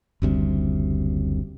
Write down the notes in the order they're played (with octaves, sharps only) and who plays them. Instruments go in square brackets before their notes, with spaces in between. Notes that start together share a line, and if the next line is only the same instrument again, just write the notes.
[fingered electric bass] F#1 D2 C3 G3